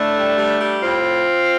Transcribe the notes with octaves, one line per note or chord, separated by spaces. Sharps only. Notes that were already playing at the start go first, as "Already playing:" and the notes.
Already playing: A2 A3 D4
G3
G3
G3
A2 C4 F4